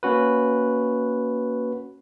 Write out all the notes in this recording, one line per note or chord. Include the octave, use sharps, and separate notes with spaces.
A#3 C#4 F#4 B4